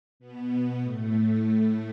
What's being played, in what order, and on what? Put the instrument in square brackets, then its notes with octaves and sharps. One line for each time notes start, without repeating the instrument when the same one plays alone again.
[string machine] B2 B3
A2 A3
A2 A3